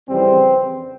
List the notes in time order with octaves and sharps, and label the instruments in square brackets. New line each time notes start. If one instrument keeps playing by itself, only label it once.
[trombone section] F2 C#3 E3 G3 C4